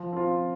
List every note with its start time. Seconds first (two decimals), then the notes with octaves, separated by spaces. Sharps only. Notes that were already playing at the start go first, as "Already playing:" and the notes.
Already playing: F3
0.13 C4 F4